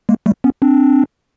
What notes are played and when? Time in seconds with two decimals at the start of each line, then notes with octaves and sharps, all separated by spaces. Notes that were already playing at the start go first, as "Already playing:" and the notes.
0.09 G#3 A#3
0.26 G3 A3
0.44 B3 C#4
0.62 C4 D4